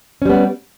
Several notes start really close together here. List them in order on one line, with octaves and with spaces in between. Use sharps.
C#4 G3 B3